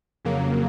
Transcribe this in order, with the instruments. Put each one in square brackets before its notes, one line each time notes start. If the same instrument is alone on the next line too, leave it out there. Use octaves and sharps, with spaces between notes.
[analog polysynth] F2 C#3 F#3 A#3